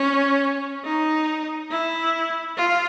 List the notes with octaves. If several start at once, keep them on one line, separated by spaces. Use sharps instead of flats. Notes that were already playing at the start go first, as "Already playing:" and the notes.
Already playing: C#4
D#4
E4
F4